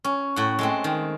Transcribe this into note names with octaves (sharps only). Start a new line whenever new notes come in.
C#4
A2 F#5
G#3 A3 C4
D#3